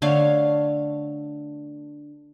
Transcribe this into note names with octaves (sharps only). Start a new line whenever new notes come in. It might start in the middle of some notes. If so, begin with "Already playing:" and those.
D3 A3 C#5 F5